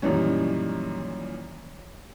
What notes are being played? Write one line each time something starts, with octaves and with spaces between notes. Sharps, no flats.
F#2 A#2 D#3 E3 G3 C#4